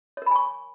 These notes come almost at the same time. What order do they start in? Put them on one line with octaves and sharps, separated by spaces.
C#5 A#4 B5 G#5 C#6